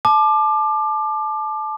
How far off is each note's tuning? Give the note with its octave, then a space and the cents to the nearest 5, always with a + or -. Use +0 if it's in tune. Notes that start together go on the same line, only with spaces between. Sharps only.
A5 -25 D6 +25